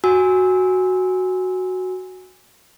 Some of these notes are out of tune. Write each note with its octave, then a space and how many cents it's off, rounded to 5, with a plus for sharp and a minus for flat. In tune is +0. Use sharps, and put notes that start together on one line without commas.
F#4 +0 G#5 -10 E6 -20